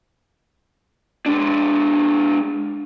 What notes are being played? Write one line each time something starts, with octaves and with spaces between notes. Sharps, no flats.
G#3 D4